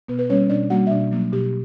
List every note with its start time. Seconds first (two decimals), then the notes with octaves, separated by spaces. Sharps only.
0.08 B2 B3 B4
0.19 B4
0.30 G3 A#3 C#4 C#5
0.49 B2 D4 D5
0.70 G3 A#3 F#4 F#5
0.87 E5
0.91 B2 D4 D5
1.12 F#3 A#3
1.33 B2 G4